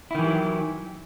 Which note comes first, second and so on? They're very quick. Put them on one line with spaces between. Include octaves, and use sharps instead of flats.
E4 D#3 E3 G4 F#3